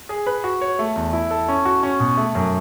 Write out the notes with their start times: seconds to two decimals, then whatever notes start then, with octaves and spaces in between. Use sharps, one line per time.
0.09 G#4
0.27 B4
0.44 F#4
0.61 C#5
0.79 A3
0.96 E2
1.13 E4
1.31 A4
1.48 C#4
1.65 F#4
1.83 C#4
2.00 B2
2.17 A3
2.35 F#2